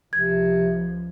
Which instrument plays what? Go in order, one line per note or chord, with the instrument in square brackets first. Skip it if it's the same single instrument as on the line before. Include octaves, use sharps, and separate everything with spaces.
[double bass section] C#2 F3 [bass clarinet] C3 [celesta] G#6